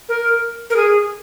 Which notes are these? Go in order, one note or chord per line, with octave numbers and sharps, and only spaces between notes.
A#4
A#4
G#4